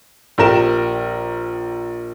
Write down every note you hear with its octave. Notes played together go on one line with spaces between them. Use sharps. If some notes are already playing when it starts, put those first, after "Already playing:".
A#1 G4 A#4 E7